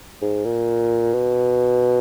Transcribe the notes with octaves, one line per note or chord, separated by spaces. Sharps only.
G#2
A#2
B2